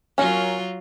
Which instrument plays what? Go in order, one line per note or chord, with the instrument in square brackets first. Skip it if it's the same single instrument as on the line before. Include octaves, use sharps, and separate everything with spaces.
[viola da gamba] F#3 F4 [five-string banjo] C#4 A#4